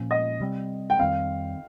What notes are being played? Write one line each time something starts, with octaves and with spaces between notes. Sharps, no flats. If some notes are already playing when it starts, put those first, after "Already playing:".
Already playing: A#2 F3 A#3 C#4
D#5
C3 G3 C4
G5
F2 D#3 G3 C4 F5